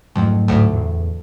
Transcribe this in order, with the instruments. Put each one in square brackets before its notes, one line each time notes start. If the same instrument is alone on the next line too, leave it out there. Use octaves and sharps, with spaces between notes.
[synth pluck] F2 [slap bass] G#2 F#3 A3
[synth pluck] D2 A2
[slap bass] E2